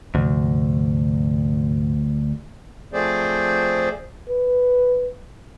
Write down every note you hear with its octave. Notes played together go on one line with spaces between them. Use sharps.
D2 G#2 C3 F3
F3 A3 C4 G#4 C5 D5
B4